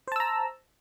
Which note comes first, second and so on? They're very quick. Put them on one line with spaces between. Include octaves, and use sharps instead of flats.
C5 A5 E6 A#5